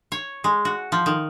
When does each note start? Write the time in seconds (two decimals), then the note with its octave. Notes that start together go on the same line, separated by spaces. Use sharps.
0.12 C#5
0.44 G#3
0.65 F#4
0.92 F3
1.06 D#3